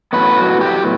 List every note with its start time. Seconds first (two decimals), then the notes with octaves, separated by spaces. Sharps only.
0.13 A2 F#3 B3 B4
0.37 F#4
0.61 G4